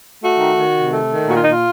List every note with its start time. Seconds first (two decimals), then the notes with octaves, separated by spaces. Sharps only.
0.22 A3 F#4
0.40 D#3
0.57 D#3
0.75 C3
0.92 A3
1.10 D#3
1.28 A#2 F#4
1.36 F4
1.44 D#4
1.46 A#2 F4